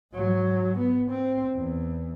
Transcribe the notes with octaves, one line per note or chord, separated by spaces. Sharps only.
G#2 F#3
B3
C4
E2